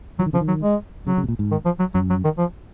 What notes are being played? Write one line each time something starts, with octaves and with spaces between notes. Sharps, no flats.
F3 F#3
D#3
C#3 F3
D#3
F#3
G#3
C#3 F#3
C#3
B2
A#2
G#2
D#3
F3
F#3
F#2 F#3
F#3
D#3
F3